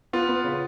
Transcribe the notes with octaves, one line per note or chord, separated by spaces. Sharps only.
B3 F4
B3
C#3